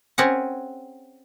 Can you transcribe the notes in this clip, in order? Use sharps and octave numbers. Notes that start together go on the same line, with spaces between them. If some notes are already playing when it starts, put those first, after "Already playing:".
C4 C#4 G#4 F#5